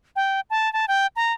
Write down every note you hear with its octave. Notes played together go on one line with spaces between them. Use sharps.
G5
A5
A5
G5
A#5